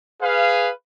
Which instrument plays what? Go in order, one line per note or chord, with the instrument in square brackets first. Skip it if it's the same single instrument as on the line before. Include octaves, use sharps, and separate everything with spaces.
[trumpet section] G#4 B4 F5